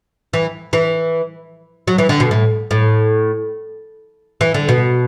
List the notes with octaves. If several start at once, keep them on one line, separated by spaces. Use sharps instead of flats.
E3
E3
F#3
E3
D3
B2
A2
A2
E3
D3
B2